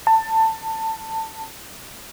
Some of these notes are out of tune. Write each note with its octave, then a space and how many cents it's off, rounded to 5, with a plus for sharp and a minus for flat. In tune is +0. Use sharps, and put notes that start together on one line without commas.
A5 +20